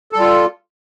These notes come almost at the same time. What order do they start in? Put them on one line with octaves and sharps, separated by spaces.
A4 G3 F4